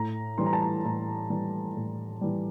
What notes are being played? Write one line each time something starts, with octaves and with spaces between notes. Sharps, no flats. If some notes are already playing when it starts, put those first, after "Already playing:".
Already playing: A2 A#5
E3 G3 C6
A#5
A5
A#5
A2 A#5
E3 G3
A2
E3 G3